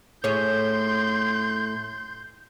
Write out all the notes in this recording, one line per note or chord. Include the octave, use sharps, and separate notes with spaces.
A2 G#4 C#5 C6 G6